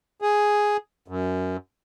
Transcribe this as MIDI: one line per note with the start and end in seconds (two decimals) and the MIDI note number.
0.22 0.77 68
1.08 1.57 42